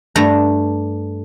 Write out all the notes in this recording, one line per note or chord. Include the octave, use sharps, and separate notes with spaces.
G2 A3 A#5